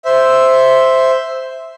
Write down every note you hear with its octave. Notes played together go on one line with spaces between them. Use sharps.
C5 E5